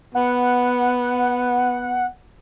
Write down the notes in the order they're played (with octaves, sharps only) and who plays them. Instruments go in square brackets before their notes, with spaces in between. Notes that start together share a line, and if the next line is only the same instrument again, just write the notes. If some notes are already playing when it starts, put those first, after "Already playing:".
[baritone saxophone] B3 [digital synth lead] F#5